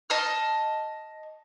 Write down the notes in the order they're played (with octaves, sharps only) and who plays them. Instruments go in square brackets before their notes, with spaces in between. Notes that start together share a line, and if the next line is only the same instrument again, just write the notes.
[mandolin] D#5 A5 F6